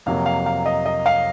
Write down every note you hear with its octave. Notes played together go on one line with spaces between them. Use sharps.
F2 C3 F#3 A#3 F5
F5
F5
D#5
D#5
F5